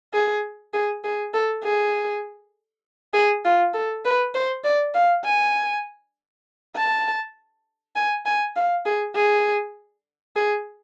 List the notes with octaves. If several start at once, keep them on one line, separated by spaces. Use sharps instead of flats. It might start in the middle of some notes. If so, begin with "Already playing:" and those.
G#4
G#4
G#4
A4
G#4
G#4
F4
A4
B4
C5
D5
F5
G#5
A5
G#5
G#5
F5
G#4
G#4
G#4